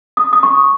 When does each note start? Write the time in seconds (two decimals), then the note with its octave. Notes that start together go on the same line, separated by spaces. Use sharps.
0.17 D#6
0.33 D#6
0.43 C#6